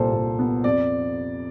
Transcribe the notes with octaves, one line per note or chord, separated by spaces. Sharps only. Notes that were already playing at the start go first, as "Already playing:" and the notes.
Already playing: C2 A#2 G3 A4 C5
A#2
B3
F2 D5